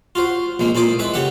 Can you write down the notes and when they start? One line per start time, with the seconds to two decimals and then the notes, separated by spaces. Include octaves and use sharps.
0.15 F4 F#4 C5
0.60 A#1 G#3 A#3 C4
0.75 A#2 E4 A4 C5 D6 D#6
0.99 G#3 E4 B4 E5
1.14 C#3 G4 A4 E5 F#5